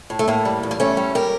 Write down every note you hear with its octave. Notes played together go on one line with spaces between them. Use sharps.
A2
A3
A2 A#3
G3
E2
A#3
G3 A3 C#4
G3
G4 A#4